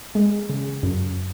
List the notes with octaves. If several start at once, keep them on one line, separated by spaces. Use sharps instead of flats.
G#3
C#3
F#2